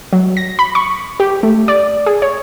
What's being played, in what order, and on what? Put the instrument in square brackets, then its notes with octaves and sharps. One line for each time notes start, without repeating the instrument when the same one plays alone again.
[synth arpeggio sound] F#3
A#6
B5
C#6
G4
A3
D5
G#4
C#5